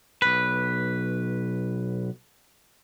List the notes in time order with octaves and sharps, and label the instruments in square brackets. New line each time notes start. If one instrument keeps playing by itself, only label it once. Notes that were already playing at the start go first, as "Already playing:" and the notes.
[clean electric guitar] B1 B4